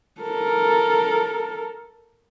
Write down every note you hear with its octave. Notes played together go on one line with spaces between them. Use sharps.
A4 A#4